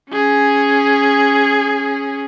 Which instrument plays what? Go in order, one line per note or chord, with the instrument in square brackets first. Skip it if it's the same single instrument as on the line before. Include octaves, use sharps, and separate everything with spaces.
[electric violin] C#4 G#4